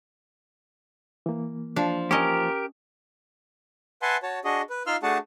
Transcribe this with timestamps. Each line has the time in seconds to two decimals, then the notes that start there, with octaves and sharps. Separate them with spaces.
1.26 E3 A#3
1.76 F3 D4
2.11 C#4 G4 A#4 C#5 D#5
4.02 B4 E5 F#5 G#5 A5 C6
4.23 F#4 C#5 A5
4.45 D4 F#4 G#4 D#5
4.70 B4
4.87 D#4 F4 F5 C6 E6 F6
5.03 A3 D4 F#4 G#4 F#5 A5